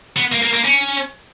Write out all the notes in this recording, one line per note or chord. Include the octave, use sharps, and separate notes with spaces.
B3
A#3
A#3
A#3
C#4